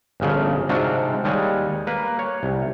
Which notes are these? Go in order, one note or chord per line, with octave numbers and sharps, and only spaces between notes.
G1 A#2 C#3 F3
G#2 C3 C4 D4 F4 F#4
D#2 G3 G#3 C#5 G#5
A#3 B4
C#5
C2